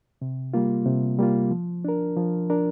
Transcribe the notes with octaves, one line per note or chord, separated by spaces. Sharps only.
C3
G3 A#3 F4
C3
G3 A#3 F4
F3
D4 A#4
F3
D4 A#4